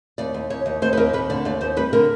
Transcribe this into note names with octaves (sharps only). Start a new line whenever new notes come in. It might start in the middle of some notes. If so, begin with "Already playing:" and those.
D#2 D5
D#2
D#2 C#5
D#2
D#2 C5
B4
D#2 A#4
D#2 B4
D3 D5
D#2 D5
D#2 C5
G3 B4
D3 A#4